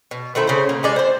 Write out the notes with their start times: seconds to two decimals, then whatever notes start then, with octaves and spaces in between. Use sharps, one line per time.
0.11 B2
0.35 D#3 A3 C4 E4
0.47 C#3 C5
0.69 A#3
0.83 G3 G#3 D5
0.96 C4 C5